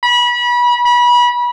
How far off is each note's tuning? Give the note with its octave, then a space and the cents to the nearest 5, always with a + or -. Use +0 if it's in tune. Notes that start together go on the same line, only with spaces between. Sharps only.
B5 -30
B5 -30